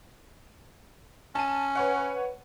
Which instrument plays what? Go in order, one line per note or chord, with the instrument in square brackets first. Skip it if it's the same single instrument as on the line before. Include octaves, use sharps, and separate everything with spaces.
[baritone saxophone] C#4 [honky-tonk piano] A5 D#7
[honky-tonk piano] B4 C#5 F#5